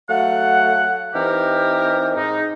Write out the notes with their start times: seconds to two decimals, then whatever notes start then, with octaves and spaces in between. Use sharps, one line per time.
0.10 F#3 A3 F5 F#5
1.15 E3 C4 D#4 G4 A#4 B4
2.17 G#2 D#4